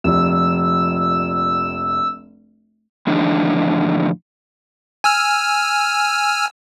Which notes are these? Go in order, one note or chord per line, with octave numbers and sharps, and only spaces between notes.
F1 A#1 E6
E2 A2 D3 F3 D4 D#4
G#5 E6 F6